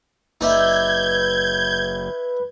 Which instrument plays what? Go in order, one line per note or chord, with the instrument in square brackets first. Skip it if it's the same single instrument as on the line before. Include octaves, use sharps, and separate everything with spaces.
[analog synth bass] F#1 [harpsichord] D#4 D5 E5 [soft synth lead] B4 [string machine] G6 G#6